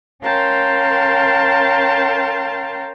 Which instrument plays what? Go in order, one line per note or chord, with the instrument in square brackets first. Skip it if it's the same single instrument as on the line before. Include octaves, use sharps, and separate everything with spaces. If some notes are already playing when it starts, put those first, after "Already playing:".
[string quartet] C#4 A#4 F5 G5 A5 C6